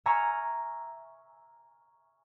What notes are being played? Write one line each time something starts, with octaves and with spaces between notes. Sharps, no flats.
E5 G#5 A#5 C#6 F6